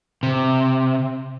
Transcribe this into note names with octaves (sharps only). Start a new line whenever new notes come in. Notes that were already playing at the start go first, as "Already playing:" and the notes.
C3